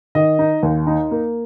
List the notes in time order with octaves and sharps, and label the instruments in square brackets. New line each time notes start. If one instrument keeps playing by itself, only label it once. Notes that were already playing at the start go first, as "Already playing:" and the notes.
[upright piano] D#3 D#5
D#4
D#2
D#4
A#3